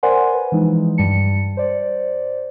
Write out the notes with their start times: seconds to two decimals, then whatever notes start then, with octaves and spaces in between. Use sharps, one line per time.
0.03 A#4 C5 D5 F#5 G#5 C6
0.33 B4
0.52 E3 F3 G#3 D#4
0.98 G2 G3 A5 C#7
1.57 C5 D5